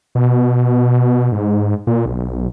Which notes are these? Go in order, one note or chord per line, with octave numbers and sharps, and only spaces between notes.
B2
G#2
A#2
B1